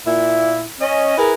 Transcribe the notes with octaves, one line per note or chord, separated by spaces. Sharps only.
A#2 E4
C#4 D#5
E4 G#4 A#4 B4